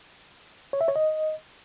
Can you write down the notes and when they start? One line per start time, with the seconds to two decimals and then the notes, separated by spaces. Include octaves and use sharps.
0.73 C#5
0.81 E5
0.88 C#5
0.96 D#5